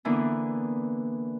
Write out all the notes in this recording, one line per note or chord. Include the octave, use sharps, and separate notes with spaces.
D3 E3 A#3 B3 D4 E4